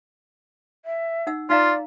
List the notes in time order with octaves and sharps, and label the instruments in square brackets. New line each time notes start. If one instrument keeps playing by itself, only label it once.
[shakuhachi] E5
[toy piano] D#4 F#5 E6
[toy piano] D#4 F5 A#5 [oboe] F4 [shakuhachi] D5